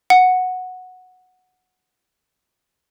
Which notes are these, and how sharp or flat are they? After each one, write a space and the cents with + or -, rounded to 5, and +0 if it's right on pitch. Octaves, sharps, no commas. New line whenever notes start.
F#5 -10